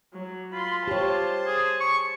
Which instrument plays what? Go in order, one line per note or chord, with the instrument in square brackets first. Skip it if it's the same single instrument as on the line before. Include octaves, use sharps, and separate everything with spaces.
[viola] F#3
[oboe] F4 [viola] B5 C6
[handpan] G4 C#5 [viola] C5 A5
[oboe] G#4
C#6